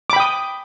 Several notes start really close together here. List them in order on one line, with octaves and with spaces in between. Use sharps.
D6 B5 G5 D#6